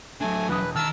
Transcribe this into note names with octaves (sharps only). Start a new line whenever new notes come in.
F#3 A3 D4 G#5
E1 B4 D#6
D#3 A5 A#5 E6 F6